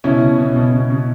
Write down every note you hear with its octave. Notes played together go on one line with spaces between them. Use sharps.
B2 C#4 E4
B2
B2
B2
B2
B2